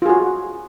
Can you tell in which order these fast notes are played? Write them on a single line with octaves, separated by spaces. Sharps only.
F4 G#4 F#4